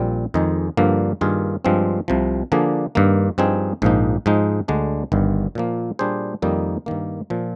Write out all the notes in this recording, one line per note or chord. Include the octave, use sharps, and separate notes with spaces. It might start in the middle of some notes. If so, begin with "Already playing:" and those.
Already playing: A#1 A#2 G3 C4
F2 D#3 G#3 D#4 G#4
G2 D3 F3 A#3
G2 D#3 A#3 F4 G#4
G2 F3 G#3 C4
C2 C3 F3
D3 F3 A#3 D4 G#4
G2 D#3 A#3
G2 F3 C4 D#4 G#4
A#1 G#2 F3 A#3 D#4
G#2 F3 G#3 D#4
D2 D3 G#3 D4
G1 G2 D#3
A#2 F3 A#3
A#2 G3 D4 G#4 C5
F2 D#3 G3 A#3 D#4
G2 D#3 A#3
A#2 F3